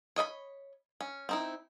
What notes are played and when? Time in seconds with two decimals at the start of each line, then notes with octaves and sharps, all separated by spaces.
0.16 C#5 D#5 F5 B5
1.01 C#4
1.29 C4 D#4 E4